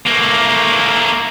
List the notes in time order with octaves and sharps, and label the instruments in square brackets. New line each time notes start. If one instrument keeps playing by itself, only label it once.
[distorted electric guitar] A3 A#3